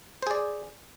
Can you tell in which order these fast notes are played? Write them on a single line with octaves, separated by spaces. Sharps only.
C5 G#4 D5